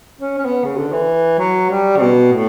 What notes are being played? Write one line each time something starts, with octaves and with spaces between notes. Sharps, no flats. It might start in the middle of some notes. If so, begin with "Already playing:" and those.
C#4
C#4
B3
C#3
D3
E3
F#3
G3
C#3
B2
A2